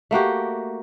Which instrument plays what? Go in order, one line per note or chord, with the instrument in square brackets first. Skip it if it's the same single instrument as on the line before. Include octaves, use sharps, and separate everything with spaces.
[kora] A3 A#3 F#4 G4